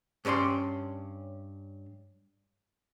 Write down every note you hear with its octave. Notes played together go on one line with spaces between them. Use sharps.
G2 C#4 D5 B5 C6